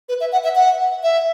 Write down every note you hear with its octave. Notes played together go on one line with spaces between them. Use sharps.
B4
E5
F#5
E5
F#5
E5